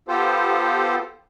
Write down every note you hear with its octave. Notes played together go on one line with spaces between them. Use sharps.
B3 F4 G4 A4 C5